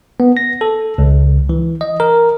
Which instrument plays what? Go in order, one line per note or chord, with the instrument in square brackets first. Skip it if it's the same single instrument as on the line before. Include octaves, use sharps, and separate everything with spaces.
[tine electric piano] B3
A#6
A4
C#2
E3
D#5
A#4